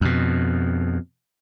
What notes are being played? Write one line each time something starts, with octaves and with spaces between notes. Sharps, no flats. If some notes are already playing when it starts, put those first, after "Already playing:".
F2 B2